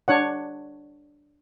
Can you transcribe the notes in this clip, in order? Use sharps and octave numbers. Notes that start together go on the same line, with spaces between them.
D4 C#5 F#5